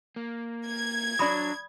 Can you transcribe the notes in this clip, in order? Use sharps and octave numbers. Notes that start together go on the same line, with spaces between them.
A#3
G#6
F#3 D4 D5 B5 D#6